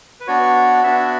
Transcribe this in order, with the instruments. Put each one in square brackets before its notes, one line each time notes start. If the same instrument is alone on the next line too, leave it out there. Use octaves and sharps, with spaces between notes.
[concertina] B4
B3 D4 F#4 C#5
B3 D4 F#4 E5